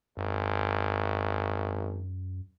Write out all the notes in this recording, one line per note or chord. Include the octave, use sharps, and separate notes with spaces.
G#1 F#2